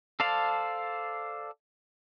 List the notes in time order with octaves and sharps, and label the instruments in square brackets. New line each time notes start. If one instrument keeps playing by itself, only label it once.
[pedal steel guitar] A4 C5 D5 F5 A5